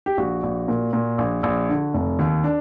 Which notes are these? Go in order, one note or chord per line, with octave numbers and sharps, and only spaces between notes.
G4
A#1 F#4
A#1
A#2
A#2
A#1
A#1
D3
F1
D#2
D4